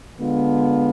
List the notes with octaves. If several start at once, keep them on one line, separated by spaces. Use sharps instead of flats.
D3 G#3 B3 F4